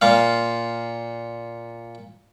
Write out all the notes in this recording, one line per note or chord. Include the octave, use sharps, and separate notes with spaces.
A#2 F4 F5